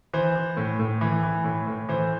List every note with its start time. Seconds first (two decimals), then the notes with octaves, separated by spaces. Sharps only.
0.13 E3 C5
0.36 E3
0.57 A2
0.80 A2
1.01 E3
1.24 E3
1.45 A2
1.67 A2
1.89 E3 C5